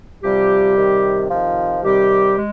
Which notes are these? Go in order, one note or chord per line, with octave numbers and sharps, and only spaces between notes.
C3 F3 G3 G4
C3 D#3
C3 D#3 F3 F4
C3 D#3 G3 G4
G#3